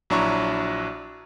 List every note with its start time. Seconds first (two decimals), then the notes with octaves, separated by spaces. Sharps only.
0.10 A#1 F#3 D4 E4 A#5 C#6